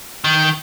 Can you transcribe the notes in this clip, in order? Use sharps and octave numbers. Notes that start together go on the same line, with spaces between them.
D#3